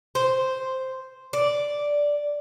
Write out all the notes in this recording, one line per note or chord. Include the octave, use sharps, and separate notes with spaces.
C5
D5